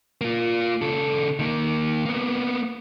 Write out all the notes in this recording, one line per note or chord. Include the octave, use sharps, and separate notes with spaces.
A#3 F4
C#3 A4
D#3 A#3
A#3 B3